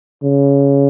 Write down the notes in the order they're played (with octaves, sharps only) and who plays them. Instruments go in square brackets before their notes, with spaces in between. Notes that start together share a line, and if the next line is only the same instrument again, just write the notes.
[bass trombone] C#3